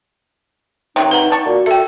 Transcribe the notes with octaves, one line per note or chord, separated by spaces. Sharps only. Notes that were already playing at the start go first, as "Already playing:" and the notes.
C3 D#3 F#3 D#4
B4 F#5 A#5
D#4 A5 C#6
A#2 F#4
A4 E5 G5